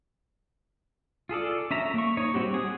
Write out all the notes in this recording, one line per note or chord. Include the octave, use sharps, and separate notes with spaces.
F4 G#4 A4 D5
C#4 E5 A#5
A#3 C#6
D#4 C#5
G3 C4 F#4 G4
G#4 F#5